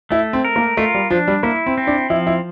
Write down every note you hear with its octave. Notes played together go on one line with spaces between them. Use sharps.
A3 E4
C4
A#4
A#3
A3 F4
G3
F3 D4
G3
A#3 E4
C4
C4
D4
F3 E4
E4